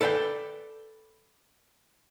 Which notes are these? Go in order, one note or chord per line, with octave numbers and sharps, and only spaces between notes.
A4 B4 D5 F#5 G5